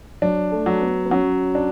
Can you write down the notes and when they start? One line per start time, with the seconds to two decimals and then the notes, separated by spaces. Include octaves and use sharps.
0.22 F#3 D4
0.51 A3
0.66 F#3
0.81 B3
1.05 B3
1.11 F#3 C#4
1.55 D4